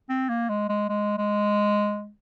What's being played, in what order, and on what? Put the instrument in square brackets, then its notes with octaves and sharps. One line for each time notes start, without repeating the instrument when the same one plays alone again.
[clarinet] C4
A#3
G#3
G#3
G#3
G#3